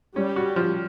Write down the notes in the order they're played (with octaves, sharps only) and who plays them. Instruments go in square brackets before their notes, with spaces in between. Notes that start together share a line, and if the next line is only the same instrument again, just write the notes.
[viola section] G3 [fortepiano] C#4
[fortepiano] F#4
F3